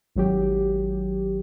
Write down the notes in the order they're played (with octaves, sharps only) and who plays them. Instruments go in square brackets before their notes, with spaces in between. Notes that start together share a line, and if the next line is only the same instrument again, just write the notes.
[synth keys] G#1 F#3 G4